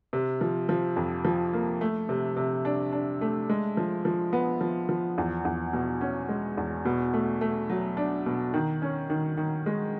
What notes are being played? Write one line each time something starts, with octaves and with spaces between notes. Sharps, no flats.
C3
F3
F3
F2
F3
A#3
A3
C3
C3
D4
D4
A3
G#3
F3
F3
B3
F3
F3
E2
E2
B2
C#4
G#3
E2
B2
A3
A3
F#3
D4
B2
D#3
C#4
D#3
D#3
G#3